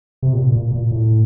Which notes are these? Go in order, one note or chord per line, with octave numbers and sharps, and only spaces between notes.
C3
A#2
A#2
A#2
A2